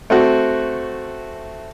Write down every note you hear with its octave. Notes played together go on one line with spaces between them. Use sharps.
A3 C4 F#4